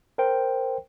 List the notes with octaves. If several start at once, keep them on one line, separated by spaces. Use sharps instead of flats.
A#4 C5 G5